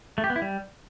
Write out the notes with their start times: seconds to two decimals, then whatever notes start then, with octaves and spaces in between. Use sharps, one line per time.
0.18 A3
0.24 G4
0.30 B3
0.36 E4
0.42 G3